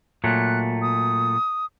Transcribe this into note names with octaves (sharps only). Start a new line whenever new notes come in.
A#2 F#3 A3 F#6
D#6